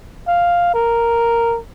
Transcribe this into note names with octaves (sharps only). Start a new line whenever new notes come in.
F5
A#4